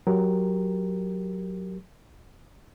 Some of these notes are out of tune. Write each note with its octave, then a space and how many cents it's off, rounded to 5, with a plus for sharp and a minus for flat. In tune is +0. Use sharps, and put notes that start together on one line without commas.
F#3 +0 G4 +0 A#4 +0